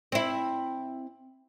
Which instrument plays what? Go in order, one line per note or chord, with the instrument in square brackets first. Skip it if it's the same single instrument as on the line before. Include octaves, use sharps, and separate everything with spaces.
[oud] C4 E4